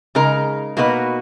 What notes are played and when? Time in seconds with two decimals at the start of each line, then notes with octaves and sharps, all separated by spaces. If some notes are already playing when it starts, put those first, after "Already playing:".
0.15 C#3 G#3 D#4 A#4
0.77 B2 A#3 D#4 F#4 B4